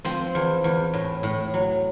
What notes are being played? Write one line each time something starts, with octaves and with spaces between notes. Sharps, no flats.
F3 C4
E2
E2
A2
A2
F#3